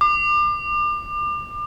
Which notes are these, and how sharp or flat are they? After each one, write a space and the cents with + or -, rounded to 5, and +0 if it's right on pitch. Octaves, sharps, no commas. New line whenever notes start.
D6 +35